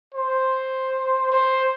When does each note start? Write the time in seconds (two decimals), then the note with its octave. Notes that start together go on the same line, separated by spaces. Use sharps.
0.14 C5
1.32 C5